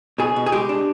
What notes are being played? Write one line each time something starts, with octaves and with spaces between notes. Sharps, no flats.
B2 G#4
B2
G#4
G#3 G4
D4